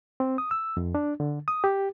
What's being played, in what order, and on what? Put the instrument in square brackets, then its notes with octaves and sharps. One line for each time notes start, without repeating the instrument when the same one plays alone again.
[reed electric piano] C4
D#6
E6
F2
D4
D3
D#6
G4